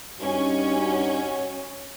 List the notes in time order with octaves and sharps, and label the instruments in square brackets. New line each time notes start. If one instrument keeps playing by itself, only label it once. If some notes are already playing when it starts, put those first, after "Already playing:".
[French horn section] G2 D#4 F#4 [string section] C#4